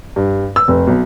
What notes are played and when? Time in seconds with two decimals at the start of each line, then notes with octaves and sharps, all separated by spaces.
0.16 G2
0.56 E6
0.68 F1
0.87 B1